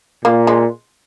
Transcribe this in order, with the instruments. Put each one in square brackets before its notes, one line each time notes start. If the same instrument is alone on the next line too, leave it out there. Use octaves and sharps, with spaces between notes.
[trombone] A#2 [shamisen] A#3
[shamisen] G#3